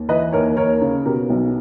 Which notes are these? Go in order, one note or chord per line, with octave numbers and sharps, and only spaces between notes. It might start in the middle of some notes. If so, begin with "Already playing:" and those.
Already playing: D#2
E3 B4 D#5
D#2 A#4 C#5
D#2 A#4 C#5
C#3
B2 G4 A#4
B1